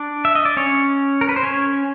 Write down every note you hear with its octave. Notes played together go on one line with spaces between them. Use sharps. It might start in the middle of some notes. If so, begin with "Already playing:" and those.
Already playing: D4 D5
E5
D#5
D5
C#4 C#5
A#4
B4
C5
C#4 C#5